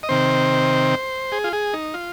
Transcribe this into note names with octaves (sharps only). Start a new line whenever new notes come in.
D#5
C3 D#3 C4 C5
G#4
F4
G#4
D#4
F4